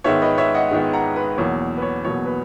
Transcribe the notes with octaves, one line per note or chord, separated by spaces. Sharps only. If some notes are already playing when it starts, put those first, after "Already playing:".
G#2 D#3 G#3 B3 C#5 E5
B4 D#5
C#5 E5
D#5 F#5
G#2 D#3 G#3 B3
F#5 A#5
B4
E2 B2 F#3 A#3 C#5
B4
C#5
E2 B2 F#3 A#3 C#5
B4